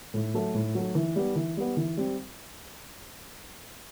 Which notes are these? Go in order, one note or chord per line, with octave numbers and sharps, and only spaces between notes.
A2
F#3 A3
A2
F#3 A3
E3
G3 B3
E3
G3 B3
E3
G3 C4